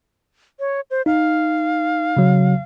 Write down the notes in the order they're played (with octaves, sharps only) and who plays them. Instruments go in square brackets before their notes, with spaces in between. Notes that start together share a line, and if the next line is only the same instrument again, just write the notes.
[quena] C#5
C5
[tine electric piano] D#4 [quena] F5
[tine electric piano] C#3 F#3